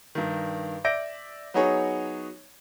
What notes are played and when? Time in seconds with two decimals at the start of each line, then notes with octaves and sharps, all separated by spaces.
0.15 G2 D#3
0.84 D5 E5 G6 A#6 D7
1.54 F#3 B3 D#4 G#4 C#5